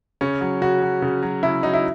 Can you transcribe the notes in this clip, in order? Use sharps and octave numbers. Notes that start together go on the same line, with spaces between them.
C#3 C#4
F#3
C#3 F#4
F#3
C#3
F#3
C#3 E4
F#3 D#4
E4